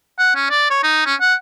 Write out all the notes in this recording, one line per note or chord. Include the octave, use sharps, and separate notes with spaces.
F#5
C#4
D5
C#5
D#4
C#4
F#5